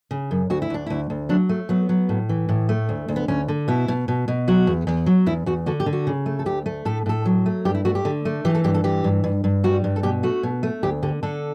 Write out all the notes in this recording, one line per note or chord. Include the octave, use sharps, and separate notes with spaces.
C#3
F#2
D2 F#4
E4
D2 D4
D2 E4
D2
F#3 D4
A3
F#3 B3
F#3
A2
E3
A2
A3
D2
D2
B3
D2 C#4
D3
B2 E4
B2
B2
B2
F#3 F#4
E2
E2
F#3
E2 E4
E2 F#4
D3 F#4
G4
D3
F#4
C#3
A3
A4
D2 G4
A3
A2 A4
A2 A4
F#3
A3
G2 G4
E4
A3 F#4
G4
D3
A3
E3 G4
A4
G2 G4
A4
E3 G4
G2
G2
G2
G3 F#4
G2
A4
B2 G4
A3 F#4
B2
A3
D2 G4
D3 G4
D3 A4